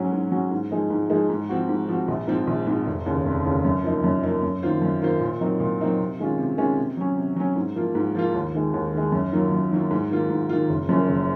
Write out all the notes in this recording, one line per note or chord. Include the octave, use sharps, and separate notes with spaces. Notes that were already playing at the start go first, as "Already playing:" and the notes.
Already playing: G#2 F#3 C#4 F#4
G#2
F#3 C#4 F#4
G#2
F3 G#3 D#4 G#4
G#2
F3 G#3 D#4 G#4
G#2
F3 C4 F#4
G#2
F3 C4 F#4
A#1
G#2 F3 C4
A#1
G#2 F3 C4
F1
D#2 C#3
F1
D#2 C#3
F#2
F3 A#3 D#4
F#2
F3 A#3 D#4
F#2
D#3 A#3 F4 C5
F#2
D#3 A#3 F4 C5
A#2
F#3 C4 D#4 A#4
A#2
F#3 C4 D#4 A#4
C3
D#3 G#3 C#4 F4
C3
D#3 G#3 C#4 F4
C3
F#3 C#4
C3
F#3 C#4
G#2
F3 A#3 F4
G#2
F3 A#3 F4
D#2
D#3 G#3
D#2
D#3 G#3
F#2
D#3 F#3 A#3 F4
F#2
D#3 F#3 A#3 F4
G#2
D#3 A#3 F4
G#2
D#3 A#3 F4
F#1
F#2 F3 A#3 C#4
F#1